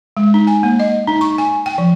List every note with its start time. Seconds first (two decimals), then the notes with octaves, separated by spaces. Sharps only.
0.17 G#3
0.34 D#4
0.47 G#5
0.63 A#3
0.80 D#5
1.07 D#4
1.21 C#6
1.38 G#5
1.66 G5
1.78 F3